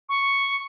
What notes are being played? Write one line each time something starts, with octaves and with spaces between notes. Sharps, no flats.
C#6